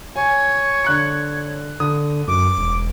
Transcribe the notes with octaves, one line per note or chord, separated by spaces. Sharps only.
C#5 G#5
D3 F#6 C#7
D3 D#6
F#2 D6
E1